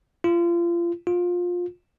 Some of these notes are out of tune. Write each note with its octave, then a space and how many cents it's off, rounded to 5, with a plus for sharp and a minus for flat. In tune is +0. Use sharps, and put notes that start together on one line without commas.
F4 -30
F4 +20